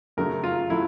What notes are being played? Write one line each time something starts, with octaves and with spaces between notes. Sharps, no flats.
F#2 C#3 F#3 A3 A#4
F4
F#3 A3 E4